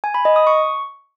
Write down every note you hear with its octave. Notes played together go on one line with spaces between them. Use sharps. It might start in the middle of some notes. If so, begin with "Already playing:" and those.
G#5
B5
D#5
D#6
C#6